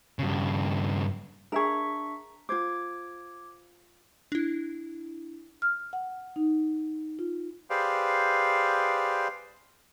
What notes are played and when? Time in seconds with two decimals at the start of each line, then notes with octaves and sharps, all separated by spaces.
0.19 G2 C#3
1.52 D4 G#4 A#4 E5 C#6
2.49 F4 C5 D6 G#6
4.32 D4 E4
5.62 F6
5.93 F#5
6.36 D#4
7.19 F4
7.70 G4 G#4 B4 C5 D5 F5